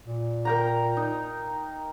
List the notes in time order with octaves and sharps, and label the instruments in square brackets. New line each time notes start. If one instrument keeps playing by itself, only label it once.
[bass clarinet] A#2
[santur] A#4 G5 A#5
D#4